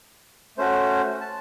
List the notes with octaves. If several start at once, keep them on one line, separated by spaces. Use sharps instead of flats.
A3 C#4 F#4 C5
A5